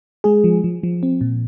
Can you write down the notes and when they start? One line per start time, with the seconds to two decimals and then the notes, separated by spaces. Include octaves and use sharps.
0.24 G#3 G#4
0.44 F3
0.64 F3
0.83 F3
1.03 C4
1.21 A#2